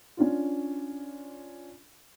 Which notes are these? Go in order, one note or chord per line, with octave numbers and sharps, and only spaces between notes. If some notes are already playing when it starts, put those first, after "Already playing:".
C#4 D4 F4